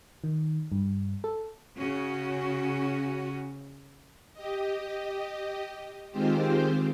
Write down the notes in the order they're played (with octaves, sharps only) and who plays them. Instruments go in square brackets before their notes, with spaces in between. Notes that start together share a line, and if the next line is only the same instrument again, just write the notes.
[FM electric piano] D#3
G2
A4
[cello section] C#3 C#4 F#4
[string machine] G4 D#5
D#3 G#3 C4 F4 G4 C5